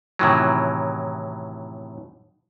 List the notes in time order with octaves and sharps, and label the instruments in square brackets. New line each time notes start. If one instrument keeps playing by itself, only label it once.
[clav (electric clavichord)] F#2 A2 C3 D#3 E3 F#3